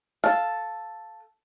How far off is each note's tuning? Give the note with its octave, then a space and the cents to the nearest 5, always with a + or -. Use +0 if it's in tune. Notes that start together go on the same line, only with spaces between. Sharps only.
A4 +0 F5 +0